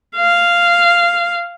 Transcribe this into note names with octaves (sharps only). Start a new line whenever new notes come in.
F5